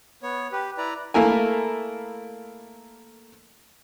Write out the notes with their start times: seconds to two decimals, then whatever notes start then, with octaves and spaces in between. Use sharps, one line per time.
0.23 B3 C#5
0.52 G4 B4
0.78 E4 B4 D5 A#5
1.14 A3 A#3 E4 A#4 G#5